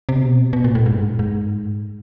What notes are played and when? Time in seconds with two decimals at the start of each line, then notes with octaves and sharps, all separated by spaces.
0.09 C3
0.20 B2
0.53 B2
0.64 A#2
0.75 A2
0.86 G#2
0.95 G2
1.03 G#2
1.11 A2
1.19 G#2